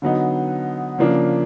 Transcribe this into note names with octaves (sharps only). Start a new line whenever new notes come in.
D3 F#3 B3 D#4
C#3 F3 A#3 D4